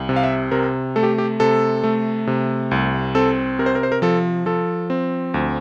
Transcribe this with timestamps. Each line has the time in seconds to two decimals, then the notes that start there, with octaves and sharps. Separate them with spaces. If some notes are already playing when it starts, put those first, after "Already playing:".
Already playing: C2
0.09 C3
0.16 F5
0.23 E5
0.51 C3 A#4
0.96 A3 A4
1.03 G4
1.18 G4
1.40 C3 A4
1.84 A3
2.27 C3
2.71 C2
3.15 C4 A4
3.59 C3 A#4
3.66 C5
3.75 A#4
3.83 C5
3.92 A#4
4.02 F3 A4
4.46 F3 A4
4.90 C4
5.34 D2